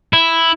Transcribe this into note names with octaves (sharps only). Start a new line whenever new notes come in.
E4